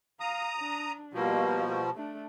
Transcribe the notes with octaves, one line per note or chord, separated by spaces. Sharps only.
F5 A#5 D#6
D4
B2 F3 G3 A#3
A3 D4